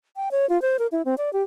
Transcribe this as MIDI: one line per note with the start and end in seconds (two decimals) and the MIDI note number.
0.16 0.29 79
0.31 0.48 73
0.49 0.60 65
0.62 0.77 72
0.79 0.87 70
0.92 1.02 64
1.05 1.15 60
1.18 1.32 74
1.33 1.43 67